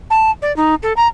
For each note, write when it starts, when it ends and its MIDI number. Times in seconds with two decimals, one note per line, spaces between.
0.10 0.31 81
0.42 0.54 74
0.56 0.75 63
0.83 0.93 69
0.97 1.07 82